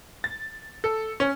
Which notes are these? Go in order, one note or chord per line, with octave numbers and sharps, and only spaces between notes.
A6
A4
C#4